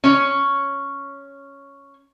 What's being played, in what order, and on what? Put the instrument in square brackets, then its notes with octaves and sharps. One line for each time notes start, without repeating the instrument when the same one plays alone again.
[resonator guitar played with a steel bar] C#4 C#5